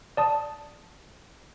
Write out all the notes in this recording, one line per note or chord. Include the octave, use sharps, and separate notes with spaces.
D5 A5 D#6